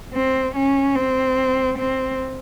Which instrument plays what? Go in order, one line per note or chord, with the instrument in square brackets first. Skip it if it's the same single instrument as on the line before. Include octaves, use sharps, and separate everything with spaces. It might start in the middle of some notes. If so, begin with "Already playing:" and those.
[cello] C4
C#4
C4
C4